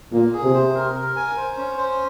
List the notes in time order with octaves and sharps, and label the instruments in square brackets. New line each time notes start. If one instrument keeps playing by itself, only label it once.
[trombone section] A#2 [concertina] A#3
[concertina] G#4
[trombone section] C3
[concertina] C5
A#4
A#4
G#5
C5
C#4
C5